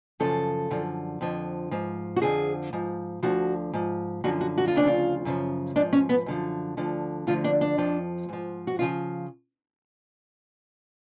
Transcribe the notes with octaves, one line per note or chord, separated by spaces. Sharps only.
F#2 C#3 F3 A4
F#2 D3 F3
F2 D3 F3
G#2 F3
F#4
F2 D3 F3 G#4
G#2 F3
D2 D3 F3 F#4
G#2 F3
F#2 D3 F3 F#4
F#4
F#4
F4
D2 C#3 F3 D4
F4
F#2 C#3 F3
G#2 F3 D4
C#4
B3
F#2 D3 F3
D2 D3 F3
D2 D3 F3 F4
D4
D4
F2 F3
G#2 F3
F#4
C#3 F3 F4